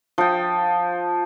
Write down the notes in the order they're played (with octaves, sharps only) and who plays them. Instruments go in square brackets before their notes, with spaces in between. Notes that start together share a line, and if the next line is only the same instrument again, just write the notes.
[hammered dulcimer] F3 G5